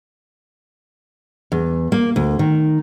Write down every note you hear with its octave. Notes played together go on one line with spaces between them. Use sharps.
E2
A#3
D2
D#3